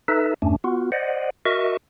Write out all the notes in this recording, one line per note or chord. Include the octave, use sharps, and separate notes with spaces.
D#4 A4 B4 E5
E2 G2 A3 C#4 D4
B3 F4 F#4
C5 D5 D#5 F#5
F#4 A#4 D#5 E5 C#6